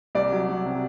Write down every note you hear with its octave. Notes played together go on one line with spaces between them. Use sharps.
C2 D5
F#3
F#3
C3